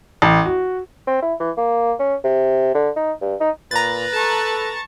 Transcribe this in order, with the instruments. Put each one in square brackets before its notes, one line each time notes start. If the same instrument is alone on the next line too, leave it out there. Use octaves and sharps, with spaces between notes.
[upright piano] A1
F#4
[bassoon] C4
E4
E3
A#3
C#4
C3
D3
D#4
G2
D#4
[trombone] A#2 [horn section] B4 [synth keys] A#5 A6
[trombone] A4 [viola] A5 C#6